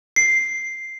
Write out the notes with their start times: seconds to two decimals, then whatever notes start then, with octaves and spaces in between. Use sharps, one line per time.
0.16 C7